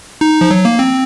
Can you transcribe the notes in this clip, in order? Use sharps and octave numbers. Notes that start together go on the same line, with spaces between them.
D#4
F3
F#3
A#3
C4